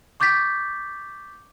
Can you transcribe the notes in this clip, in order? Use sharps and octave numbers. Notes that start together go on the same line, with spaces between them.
C#6 D6 G6 A6 B6